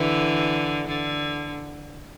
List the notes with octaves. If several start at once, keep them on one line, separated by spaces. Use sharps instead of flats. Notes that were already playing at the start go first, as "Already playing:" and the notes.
Already playing: D3 E3
D3